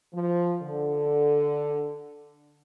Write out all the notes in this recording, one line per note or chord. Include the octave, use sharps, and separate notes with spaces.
F3
D3